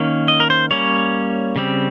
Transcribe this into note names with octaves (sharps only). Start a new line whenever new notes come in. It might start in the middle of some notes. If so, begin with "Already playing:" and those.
Already playing: D#3 A#3 C#4
D#5
A#4
C5
G3 A#3 C#4 C#5
C#3 G3 C4